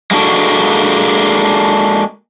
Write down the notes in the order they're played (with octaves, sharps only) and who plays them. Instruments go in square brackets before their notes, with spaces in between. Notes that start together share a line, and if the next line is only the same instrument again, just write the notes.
[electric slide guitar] G#3 A#3 D4 F#4 A4